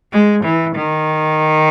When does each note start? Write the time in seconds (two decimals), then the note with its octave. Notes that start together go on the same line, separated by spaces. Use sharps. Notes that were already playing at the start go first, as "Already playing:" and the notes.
0.13 G#3
0.44 E3
0.76 D#3